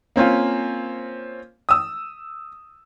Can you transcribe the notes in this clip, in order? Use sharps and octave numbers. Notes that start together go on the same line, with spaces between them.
A#3 C4 C#4 F4
D#6 E6